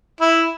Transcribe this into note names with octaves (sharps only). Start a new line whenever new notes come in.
E4